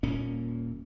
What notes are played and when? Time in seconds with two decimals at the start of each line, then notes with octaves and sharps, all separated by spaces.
0.03 D#1 A#2 A#3 C#4